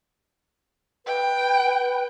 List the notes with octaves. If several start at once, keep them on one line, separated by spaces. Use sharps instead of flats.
B4 G5